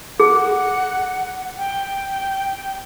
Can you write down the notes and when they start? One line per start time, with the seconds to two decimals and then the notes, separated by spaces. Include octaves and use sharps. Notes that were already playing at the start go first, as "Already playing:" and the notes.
0.20 G#4 F#5
1.58 G5